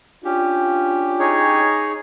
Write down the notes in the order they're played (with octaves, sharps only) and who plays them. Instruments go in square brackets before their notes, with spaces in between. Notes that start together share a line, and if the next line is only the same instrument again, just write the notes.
[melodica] C#4 G4 [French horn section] D4 F4
[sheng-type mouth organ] D#4 G#4 C#5